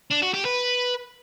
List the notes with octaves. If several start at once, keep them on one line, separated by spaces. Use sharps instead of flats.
D4
F#4
G4
B4